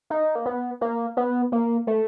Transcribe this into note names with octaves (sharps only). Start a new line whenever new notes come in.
D#4
A#3
B3
A#3
B3
A#3
A3